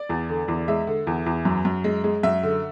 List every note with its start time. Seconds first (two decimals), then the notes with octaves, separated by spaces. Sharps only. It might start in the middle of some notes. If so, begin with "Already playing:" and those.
Already playing: D5
0.09 E2
0.29 D3
0.48 E2
0.68 G#3 E5
0.87 D3
1.07 E2
1.26 E2
1.45 F#2
1.65 F#2
1.84 G#3
2.04 G#3
2.23 F#2 E5
2.43 D3